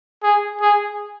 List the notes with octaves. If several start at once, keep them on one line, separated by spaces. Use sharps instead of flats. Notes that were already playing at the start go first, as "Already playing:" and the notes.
G#4
G#4